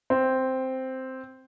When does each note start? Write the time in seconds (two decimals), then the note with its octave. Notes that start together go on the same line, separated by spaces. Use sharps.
0.10 C4